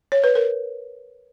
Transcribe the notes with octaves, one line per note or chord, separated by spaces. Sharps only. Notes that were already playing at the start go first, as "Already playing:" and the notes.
C#5
B4
A#4